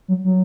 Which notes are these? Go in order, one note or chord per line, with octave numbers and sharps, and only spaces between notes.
F#3
F#3